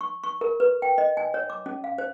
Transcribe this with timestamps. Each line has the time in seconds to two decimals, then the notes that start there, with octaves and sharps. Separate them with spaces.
0.01 C#6
0.24 C#6
0.41 A#4
0.60 B4
0.82 G5
0.98 D#5
1.17 G#5
1.34 C#5
1.50 D6
1.66 C#4
1.84 F5
1.98 C5